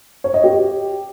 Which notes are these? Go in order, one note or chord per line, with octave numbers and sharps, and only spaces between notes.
C#5
D#5
G4